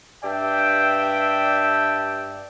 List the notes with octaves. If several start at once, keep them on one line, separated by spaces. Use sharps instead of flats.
G2 D5 E5 G5